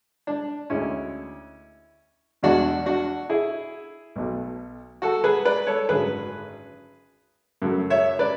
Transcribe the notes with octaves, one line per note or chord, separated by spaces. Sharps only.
D4
D2 D3 G#3 C#4 E4
E2 B2 G#3 D4 F#4
D4 F#4
E4 G#4
B1 B2 A3
F#4 A4
G#4 B4
B4 D5
A4 C#5
G#1 F#2 D3 G#4 B4
F#2 C#3 F#3 A3
C#5 E5
B4 D5